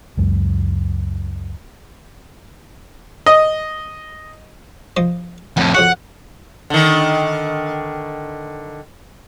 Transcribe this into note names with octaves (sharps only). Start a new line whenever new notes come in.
C#2 F#2 G#3
D#5
F3 D#5
F2 A2 F#5
F2 C#3 F#4 F#5
D3 D#3